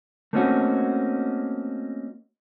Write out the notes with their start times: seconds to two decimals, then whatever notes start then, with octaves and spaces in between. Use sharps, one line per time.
0.33 A3 A#3 C4 C#4 D#4 F#4